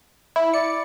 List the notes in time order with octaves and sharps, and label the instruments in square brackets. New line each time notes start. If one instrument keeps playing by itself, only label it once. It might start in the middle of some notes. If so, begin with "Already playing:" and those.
[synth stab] E4
[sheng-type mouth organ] D5 [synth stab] C#7